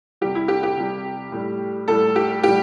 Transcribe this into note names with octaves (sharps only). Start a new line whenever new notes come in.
C3 G3 G4
E4
G4
G4
C3 G3
A2 G3
A2 G3 A4
G4
A2 G3 G4